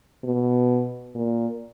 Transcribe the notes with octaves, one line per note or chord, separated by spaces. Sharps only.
B2
A#2